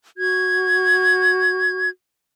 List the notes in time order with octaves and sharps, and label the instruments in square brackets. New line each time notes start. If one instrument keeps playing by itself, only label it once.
[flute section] F#4 G#6